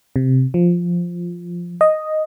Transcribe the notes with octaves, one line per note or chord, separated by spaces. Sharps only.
C3
F3
D#5